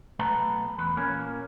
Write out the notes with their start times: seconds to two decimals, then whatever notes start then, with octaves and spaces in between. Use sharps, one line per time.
0.19 B1 A3 B3 B4 A5 A#5
0.78 E2 B4
0.96 A#2 A#3 C#4